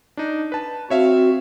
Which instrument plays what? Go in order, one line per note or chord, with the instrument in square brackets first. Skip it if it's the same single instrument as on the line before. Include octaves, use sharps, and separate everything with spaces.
[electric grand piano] D4 D#4
B4 A5
[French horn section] C4 [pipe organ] F#4 [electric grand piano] C#5 E5 F5